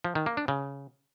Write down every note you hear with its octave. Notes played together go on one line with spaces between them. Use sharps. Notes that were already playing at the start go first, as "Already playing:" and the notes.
F3
D#3
A#3
D4
C#3